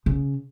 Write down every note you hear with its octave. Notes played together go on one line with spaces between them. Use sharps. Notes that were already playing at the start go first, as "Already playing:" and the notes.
C#3